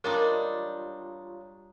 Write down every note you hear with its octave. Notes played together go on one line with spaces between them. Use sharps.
G3 D4 D#4 F4 G4 A#4 C#5